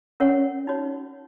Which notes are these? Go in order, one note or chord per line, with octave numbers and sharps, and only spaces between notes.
C#4 A#4 C#5 F#5
D#4 F#4 C#5